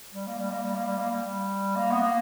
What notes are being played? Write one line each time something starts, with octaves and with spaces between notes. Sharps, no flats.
G3
A#3
G3
A#3
G3
A#3
G3
A#3
G3
A#3
B3
A#3